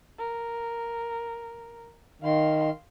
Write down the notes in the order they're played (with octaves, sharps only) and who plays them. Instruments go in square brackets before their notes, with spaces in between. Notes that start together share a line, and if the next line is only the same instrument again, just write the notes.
[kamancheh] A#4
[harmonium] D#3 [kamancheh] F5 C6